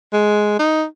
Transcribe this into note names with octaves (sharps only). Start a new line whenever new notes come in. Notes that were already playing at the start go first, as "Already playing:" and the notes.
G#3
D#4